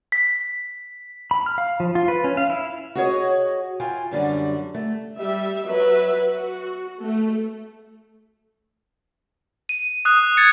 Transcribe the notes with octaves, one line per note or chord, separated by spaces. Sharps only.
B6
B5
F6
F5
F3
F4
B4
C#4
F5
E4
F#4 G#4 C#5 D#5
E4 F4 G5 G#5
F#2 D3 G3 D4
A3
G3 E5
F#3 B4 E5
F#4
A3
D#7
D#6 F#6
G#6 A6 C#7